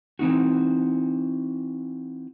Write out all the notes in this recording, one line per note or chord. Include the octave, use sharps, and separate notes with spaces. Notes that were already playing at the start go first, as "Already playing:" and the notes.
E3 C4 D#4 F#4